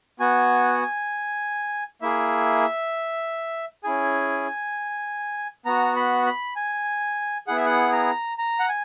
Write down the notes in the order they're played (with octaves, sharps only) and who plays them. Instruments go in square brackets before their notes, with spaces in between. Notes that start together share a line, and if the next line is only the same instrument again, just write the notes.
[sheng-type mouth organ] B3 F#4 G#5
A#3 E4 G#4 E5
C#4 E4 G#4 G#5
B3 F#4 A#5
B5
B5
G#5
B3 E4 G#4 F#5
E5
F#5
A#5
A#5
F#5
G#5